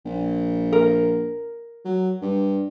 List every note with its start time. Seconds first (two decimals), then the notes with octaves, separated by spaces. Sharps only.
0.05 A#1
0.73 A#4
1.85 F#3
2.22 G2